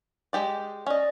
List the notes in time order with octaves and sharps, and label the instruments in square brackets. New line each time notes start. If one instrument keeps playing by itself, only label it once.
[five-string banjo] G#3 G4 D5
[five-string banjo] C#4 D#5 [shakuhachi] D5